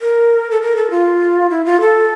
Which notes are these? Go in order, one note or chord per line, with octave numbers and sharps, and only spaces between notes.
A#4
A4
A#4
A4
F4
E4
F4
A4